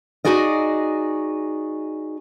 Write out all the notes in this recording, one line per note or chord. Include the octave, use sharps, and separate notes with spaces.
D#4 F#4 G#4 D5 D#5